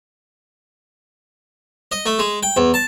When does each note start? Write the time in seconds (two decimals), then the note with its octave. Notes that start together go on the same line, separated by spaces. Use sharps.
1.92 D#5
2.06 A3
2.19 G#3
2.43 G5
2.57 E2
2.74 A5